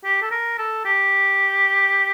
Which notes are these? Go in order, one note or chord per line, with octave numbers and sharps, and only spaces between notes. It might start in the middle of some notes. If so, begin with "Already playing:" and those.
G4
A4
A#4
A4
G4